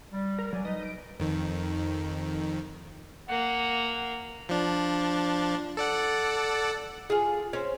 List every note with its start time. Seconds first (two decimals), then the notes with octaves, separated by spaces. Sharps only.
0.13 G3
0.39 A#4
0.53 F#3 D5 G#5
0.65 D#4 B4 D#5
0.83 D7
1.20 F2 D#3
3.29 A#3 F#5
4.49 F3 D4
5.77 A4 D5 F#5
7.10 F4 G#4
7.53 C4 C#4